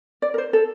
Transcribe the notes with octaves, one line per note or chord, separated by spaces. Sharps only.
D5
A#4
C5
A4